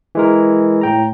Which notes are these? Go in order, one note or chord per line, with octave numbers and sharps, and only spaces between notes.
E3 G#3 A#4
A2 G5 A#5